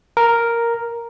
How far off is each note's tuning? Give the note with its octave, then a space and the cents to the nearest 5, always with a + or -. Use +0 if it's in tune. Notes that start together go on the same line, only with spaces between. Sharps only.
A#4 +0